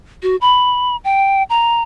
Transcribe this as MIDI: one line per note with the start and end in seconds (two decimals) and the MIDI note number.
0.23 0.36 66
0.41 0.96 83
1.04 1.43 79
1.50 1.83 82